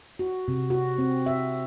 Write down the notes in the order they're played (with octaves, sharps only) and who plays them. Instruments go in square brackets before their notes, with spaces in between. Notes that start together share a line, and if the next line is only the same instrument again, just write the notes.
[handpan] F#4
C3
F#4
C4
E5